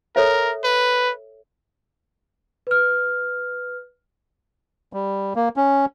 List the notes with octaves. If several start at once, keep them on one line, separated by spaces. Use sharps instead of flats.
A4 A#4 C#5 E5
B4
B4 F6
G3
A#3
C#4